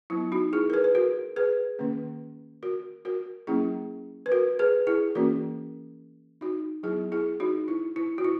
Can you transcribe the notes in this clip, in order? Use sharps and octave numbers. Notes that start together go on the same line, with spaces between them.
F#3 B3 E4
D#4 F#4
E4 G#4
A#4
G#4 B4
B4
F#4 A#4
G#4 B4
D#3 A#3 C#4
F#4 A#4
F#4 A#4
F#3 A#3 C#4 E4 G#4
B4
F#4 A#4
G#4 B4
E4 G#4
E3 A#3 C#4 F#4 A#4
D#4 F#4
F#3 B3 E4 G#4
E4 G#4
D#4 F#4
E4
E4
F#4
E4